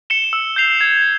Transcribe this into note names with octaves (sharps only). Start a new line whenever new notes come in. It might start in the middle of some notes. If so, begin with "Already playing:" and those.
C#7 E7 G7
E6
G6 C7 F7
G#6